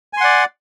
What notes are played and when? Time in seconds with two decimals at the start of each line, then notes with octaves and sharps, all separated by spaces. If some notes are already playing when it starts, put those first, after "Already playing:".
0.13 G#5
0.17 C6
0.21 F#5
0.24 D5